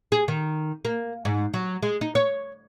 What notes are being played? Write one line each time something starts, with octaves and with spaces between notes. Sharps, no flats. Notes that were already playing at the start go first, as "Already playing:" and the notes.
G#4
D#3
A#3
G#2
F#3
G#3
D#4
C#5